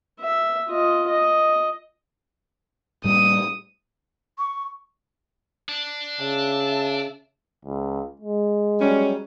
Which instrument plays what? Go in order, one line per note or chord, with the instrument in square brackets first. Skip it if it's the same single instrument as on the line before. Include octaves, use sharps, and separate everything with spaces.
[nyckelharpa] E5
F4 D#5
D#5
[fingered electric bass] A2 G3 A#3 [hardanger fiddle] D#6
[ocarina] C#6
[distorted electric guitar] D4
[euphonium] C#3 [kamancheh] E5 A5
[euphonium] C#2
G#3
[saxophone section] F#3 G3 C#4